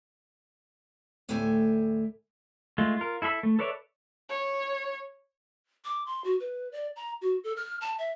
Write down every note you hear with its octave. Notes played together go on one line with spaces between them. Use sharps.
D2 A2 A3 G4 E5 G#5
G#3 A3 F4
F4 A#4
E4 A4 E5 B5 E6
A3
A4 B4 C#5 D5 E5
C#5
D6
C6
F#4
B4
D5
A#5
F#4
A4
F6
A5
E5